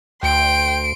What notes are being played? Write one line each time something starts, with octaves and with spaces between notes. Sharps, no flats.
D2 G5 C6 D7